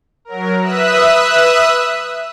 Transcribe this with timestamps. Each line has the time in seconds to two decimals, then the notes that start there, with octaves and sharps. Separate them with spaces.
0.25 F#3 A#4
0.61 B4 E5 D#6 E6 F#6